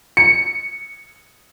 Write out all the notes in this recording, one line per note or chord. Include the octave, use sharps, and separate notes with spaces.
C#7